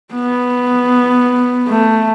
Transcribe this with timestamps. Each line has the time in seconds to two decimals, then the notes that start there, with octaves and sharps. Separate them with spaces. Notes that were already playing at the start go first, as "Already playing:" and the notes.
0.14 B3
1.68 A3